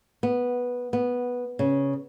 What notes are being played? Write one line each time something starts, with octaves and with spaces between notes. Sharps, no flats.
B3
B3
C#3